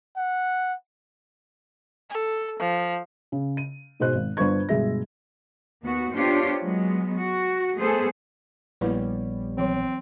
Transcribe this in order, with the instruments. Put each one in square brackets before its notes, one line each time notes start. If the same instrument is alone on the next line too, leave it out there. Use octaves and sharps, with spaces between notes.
[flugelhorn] F#5
[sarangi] A4
F3
[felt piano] C#3
D#7
G#2 B2 G#3 C5 F#6
G#1
G1 D4 B4 C5 C#6 G#6
G1 B2 G#3 G#4 E5 A#6
[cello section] D#2 B3 F#4
B3 D4 F4 G4 C5 C#5
F#3 G#3 B3
F#4
G3 A3 B3 G#4 A4 C5
[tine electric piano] A#1 B3 C#5 [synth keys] G3 [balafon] A#3 E4 B4
[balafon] E3 F#3 [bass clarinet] C4